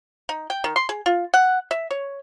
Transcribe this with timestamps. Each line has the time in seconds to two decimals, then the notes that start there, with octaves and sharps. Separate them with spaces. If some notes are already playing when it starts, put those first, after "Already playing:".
0.29 D#4
0.50 G5
0.64 D#3
0.76 C6
0.89 G#4
1.06 F4
1.34 F#5
1.71 E5
1.91 C#5